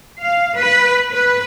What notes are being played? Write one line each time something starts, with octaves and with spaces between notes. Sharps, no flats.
F5
B4
B4